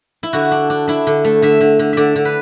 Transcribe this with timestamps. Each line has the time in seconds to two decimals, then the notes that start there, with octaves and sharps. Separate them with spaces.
0.23 E4
0.33 D3 F#4
0.52 D4
0.70 D4
0.88 D4 E4
1.07 D3
1.25 A3
1.42 D3 E5
1.61 D3
1.79 D3
1.93 D3 D5 E5
2.16 D3
2.25 B4